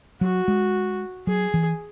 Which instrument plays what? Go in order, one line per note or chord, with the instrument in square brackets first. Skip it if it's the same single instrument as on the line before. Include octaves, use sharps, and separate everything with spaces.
[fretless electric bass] F#3 [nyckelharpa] F#4
[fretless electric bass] G#3
[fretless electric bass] F#3 [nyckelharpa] G#4
[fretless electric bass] E3